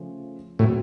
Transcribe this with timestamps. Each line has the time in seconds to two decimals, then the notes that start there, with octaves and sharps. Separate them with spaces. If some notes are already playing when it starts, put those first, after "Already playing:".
Already playing: C#3 F3 A3 C#4
0.59 A2 F#3 C4 F#4